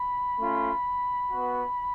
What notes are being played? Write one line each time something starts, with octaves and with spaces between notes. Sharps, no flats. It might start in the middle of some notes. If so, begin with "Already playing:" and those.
Already playing: B5
A3 C#4 F4
B3 F#4